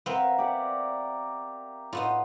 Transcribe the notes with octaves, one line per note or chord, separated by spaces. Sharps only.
B3 C4 A#4 E5 F5
G4 D5 F#5
A2 B3 D#4 F4